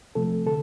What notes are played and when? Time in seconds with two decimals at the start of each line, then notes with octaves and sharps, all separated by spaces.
0.15 C3 F3 A3 A4
0.46 D3 A4